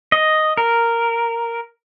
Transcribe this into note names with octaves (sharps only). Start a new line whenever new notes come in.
D#5
A#4